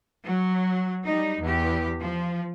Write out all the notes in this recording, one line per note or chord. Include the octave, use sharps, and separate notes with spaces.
F#3
G3 D#4
E2 G4
F3